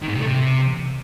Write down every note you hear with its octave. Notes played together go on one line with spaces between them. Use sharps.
D#3
G#2
C3
A3
C3